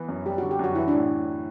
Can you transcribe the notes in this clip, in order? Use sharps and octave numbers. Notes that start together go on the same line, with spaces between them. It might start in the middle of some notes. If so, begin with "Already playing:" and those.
Already playing: E3 B3
F#2
G3 G4
D3 F#4
G4
F#2 F#4
E3 E4
A2 D4